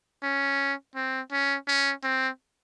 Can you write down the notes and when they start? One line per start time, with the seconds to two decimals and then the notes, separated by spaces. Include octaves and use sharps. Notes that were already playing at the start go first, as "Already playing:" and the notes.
0.23 C#4
0.96 C4
1.31 C#4
1.68 C#4
2.03 C4